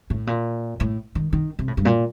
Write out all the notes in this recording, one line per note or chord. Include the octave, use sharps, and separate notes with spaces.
A2
A#2
A2
D#3
D#3
C3
A2
G2
A#2